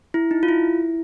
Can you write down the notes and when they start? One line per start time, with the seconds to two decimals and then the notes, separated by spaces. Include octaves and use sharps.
0.14 E4
0.31 D#4
0.43 F4
0.49 E4